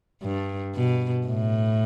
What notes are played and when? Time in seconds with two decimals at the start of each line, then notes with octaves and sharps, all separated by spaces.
0.23 G2
0.75 B2
1.27 A2